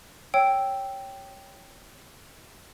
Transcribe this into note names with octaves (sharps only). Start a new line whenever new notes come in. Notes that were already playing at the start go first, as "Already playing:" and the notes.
C#5 G5 E6